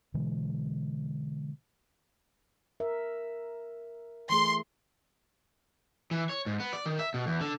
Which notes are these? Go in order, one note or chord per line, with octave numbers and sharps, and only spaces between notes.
B2 D3 E3 G#3
A#4 E5
E3 A3 G#4 C6
E3
C#5
G#2
B3
D5
D#3
E5
B2
E2
D3